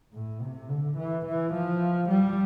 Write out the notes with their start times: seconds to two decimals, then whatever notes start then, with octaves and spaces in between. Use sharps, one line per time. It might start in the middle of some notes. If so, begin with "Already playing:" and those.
0.13 A2
0.41 C3
0.69 D3
0.97 E3
1.25 E3
1.53 F3
2.09 G3